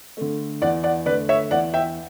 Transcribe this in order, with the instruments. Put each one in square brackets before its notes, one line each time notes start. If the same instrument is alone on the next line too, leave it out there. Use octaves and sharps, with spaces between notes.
[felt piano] D3 A3
E2 D5 F#5
D5 F#5
D3 B4 D5
A3
C#5 E5
E2 D5 F#5
E5 G5